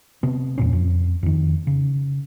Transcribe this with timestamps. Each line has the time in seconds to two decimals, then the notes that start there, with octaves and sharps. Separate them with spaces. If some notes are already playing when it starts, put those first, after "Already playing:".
0.23 C3 B3
0.58 E2 A#2 C#4
0.73 F2
1.23 F2 D#3
1.67 C#3